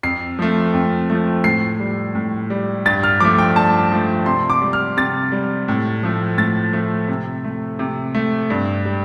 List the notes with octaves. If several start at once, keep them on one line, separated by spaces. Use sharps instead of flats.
F2 C7
F3 A3
F2
F3 A3
A2 C7
G3
A2
G3
G2 A6
F6
F3 A3 D6
G5
G2 A5
F3 A3
C3 C6
D6
G3
F6
C3 A6
G3
A2
F3 A3
A2 A6
F3 A3
C3
A3
C3
A3
G2
G3